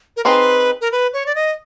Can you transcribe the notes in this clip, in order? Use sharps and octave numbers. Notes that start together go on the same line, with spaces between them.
A#4
C4 D#4 G#4 B4 C5
A#4
B4
C#5
D5
D#5